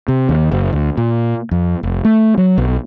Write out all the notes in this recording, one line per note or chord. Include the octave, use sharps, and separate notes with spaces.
C3
D#2
F#1
D2
A#2
F2
F1
A3
F#3
B1